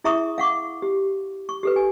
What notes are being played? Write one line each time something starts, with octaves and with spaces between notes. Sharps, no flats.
E4 G#4 E5 A#5 C#6 D#6
F5 F#5 C#6 D6
G4
C#6
G4 A4 B4
G#5